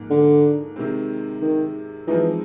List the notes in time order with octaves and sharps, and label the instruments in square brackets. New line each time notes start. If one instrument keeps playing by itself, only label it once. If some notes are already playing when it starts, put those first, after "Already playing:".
Already playing: [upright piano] G#2 F3 A#3
[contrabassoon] D3
[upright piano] C3 D#3 G#3 C4
[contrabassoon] D#3
[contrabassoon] E3 [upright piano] F3 G#3 C4 D#4